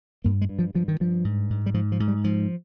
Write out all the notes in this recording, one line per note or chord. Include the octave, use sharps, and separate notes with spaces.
G2 A#3
G#3
G2
F3
G2 F3
D#3
G2 F3
G#2
G#2
G3
G#2 F3
F3
G#2
G3
G#2 F3